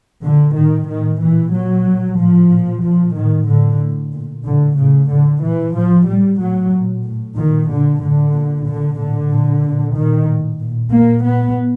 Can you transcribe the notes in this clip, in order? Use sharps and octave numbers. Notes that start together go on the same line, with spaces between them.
A#2 D3
A2 D#3
A2 D#3
A#2 E3
A#2 F#3
A#2
A2 F3
A#2
A#2 F3
A2 D#3
A2 D3
A2
A#2
A2 D3
A2 C#3
A2 D3
A#2 E3
A2 F3
A2 G3
A2 F#3
A#2
A2
A#2 D#3
A#2 D3
A2 D3
A#2
A#2 D3
A2 D3
A#2
A#2
A#2 D#3
A2
A#2
A#2 A#3
A#2 B3